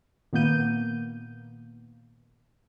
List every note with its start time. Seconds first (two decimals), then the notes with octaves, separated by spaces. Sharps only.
0.33 A#2 D#3 A#3 B3 G6 D#7